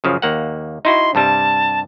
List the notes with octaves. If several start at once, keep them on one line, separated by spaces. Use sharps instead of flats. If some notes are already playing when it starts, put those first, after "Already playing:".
F#2 C#3 F3
D#2 A#3 F#5
D#4 E4 F#4 C6
G2 C3 G3 A5